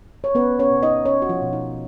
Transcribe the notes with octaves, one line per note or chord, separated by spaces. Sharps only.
C#5
B3 C#4 B4
C#4 C#5
B2
D#4 D#5
C#4 C#5
F#4
F3 F4
B2
D#4